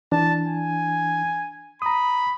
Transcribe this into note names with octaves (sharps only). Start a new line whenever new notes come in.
E3 D4 A5
G#5
A#5 B5 D#6